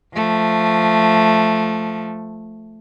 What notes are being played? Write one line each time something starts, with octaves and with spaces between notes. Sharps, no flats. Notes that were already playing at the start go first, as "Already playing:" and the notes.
F3 A3